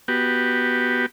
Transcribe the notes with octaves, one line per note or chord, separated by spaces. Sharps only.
B3 F#4 G4